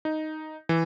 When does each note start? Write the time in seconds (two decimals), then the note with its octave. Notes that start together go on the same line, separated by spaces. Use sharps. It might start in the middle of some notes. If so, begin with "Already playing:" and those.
0.05 D#4
0.69 E3